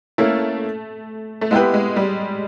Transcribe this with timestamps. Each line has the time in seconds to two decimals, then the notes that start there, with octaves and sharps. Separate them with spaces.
0.18 A3 A#3 C#4 E4
1.41 A3
1.51 G#3 B3 E4 G4 B4
1.74 G#3
1.96 G3